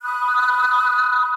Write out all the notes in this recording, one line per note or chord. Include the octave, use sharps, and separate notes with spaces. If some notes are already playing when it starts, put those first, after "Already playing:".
B5 D#6 F#6